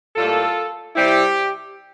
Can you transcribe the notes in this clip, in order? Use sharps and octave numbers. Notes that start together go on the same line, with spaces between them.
A2 G3 A#3 F4 A4
C3 G3 C4 E4 G4